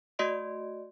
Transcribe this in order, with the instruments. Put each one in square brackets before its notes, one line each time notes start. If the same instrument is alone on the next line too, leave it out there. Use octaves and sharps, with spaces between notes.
[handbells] A3 F#4 D5 D#5 C6 D7